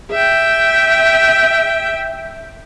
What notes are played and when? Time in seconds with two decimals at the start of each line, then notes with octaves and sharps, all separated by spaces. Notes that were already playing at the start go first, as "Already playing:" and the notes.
0.11 E5 G5